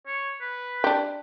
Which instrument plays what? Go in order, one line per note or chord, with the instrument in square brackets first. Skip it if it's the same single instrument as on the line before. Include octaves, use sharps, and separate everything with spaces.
[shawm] C#5
B4
[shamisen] D4 G4